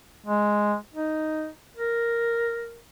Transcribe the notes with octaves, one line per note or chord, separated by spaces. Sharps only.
G#3
D#4
A#4